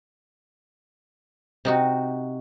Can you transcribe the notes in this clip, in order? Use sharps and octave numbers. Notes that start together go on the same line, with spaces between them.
C3 D#4 F#4